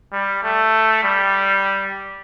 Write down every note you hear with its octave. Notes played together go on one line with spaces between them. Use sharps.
G3
A3
G3